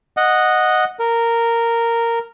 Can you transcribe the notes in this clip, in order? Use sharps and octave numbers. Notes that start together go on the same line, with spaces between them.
D#5 F#5
A#4